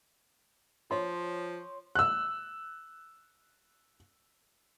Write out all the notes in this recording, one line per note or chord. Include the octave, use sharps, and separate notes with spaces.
F3 C#5 C6
E6 F#6